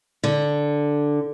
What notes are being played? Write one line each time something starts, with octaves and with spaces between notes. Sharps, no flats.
D3